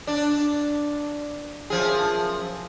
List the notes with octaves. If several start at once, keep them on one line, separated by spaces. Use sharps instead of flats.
D4
F#2 F3 G#4